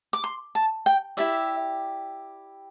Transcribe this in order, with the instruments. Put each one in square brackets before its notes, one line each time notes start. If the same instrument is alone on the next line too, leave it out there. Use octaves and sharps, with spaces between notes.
[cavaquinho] D6
C6
A5
G5
E4 G4 D5 E5